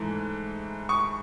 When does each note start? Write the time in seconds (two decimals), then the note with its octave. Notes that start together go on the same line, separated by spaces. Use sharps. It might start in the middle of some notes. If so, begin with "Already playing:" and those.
Already playing: G#2 E3 A3
0.89 C#6